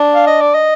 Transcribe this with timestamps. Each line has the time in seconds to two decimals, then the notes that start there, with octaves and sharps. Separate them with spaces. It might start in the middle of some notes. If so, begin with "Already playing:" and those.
Already playing: D4
0.14 F5
0.27 D#5
0.41 D5
0.54 D#5